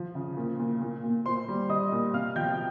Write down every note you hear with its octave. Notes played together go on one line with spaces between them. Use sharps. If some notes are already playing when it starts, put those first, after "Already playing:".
Already playing: F3
C#3
A#2
A#2
A#2
A#2
A#2 C5 C6
G3
G3 D#5 D#6
A#2
C3 F5 F6
F3 G5 G6